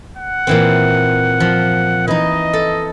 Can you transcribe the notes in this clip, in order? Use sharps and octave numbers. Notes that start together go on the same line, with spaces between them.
F#5
A#2 E3 C4
F3
E3 D#4 D#5
A4